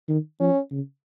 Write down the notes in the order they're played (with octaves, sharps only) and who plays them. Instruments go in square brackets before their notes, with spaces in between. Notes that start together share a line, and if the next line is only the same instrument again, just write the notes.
[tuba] D#3
[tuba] F3 [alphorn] C#4
[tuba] C#3